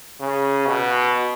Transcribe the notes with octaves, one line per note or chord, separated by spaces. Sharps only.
C#3
B2